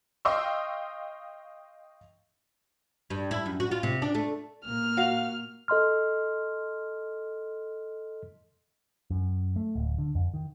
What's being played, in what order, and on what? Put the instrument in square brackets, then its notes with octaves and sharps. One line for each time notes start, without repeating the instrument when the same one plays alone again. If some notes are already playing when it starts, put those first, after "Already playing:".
[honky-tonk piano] D#5 F5 G5 C6 C#6 E6
[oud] G2
E4
F#2
F#4
F4
C3
D4
A3
[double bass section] A#2 A#3 [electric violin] F6
[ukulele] F#4 F5
[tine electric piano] A4 D#5 C6 F6
[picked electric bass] F#2
A3
D1
D3
F2
D#3